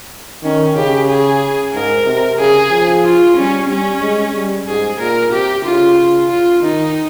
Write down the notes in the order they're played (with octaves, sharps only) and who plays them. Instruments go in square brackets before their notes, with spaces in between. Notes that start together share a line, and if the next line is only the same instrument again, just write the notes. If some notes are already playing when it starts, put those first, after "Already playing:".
[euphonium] D#3 [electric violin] C#4
[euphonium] C#3 [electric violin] G4
[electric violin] G#4
[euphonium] G#2 [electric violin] A#4
[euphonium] C3
[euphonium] C#3 [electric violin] G#4
[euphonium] F3
[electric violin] F4
[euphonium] G3 [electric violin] C#4
[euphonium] G3 [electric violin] C#4
[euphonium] G#3
G3
[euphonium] G#2 [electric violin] G#4
[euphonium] A#2 [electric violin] A#4
[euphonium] C3 [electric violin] G4
[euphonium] C#3 [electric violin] F4
[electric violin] F4
[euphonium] D#3 [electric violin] D#4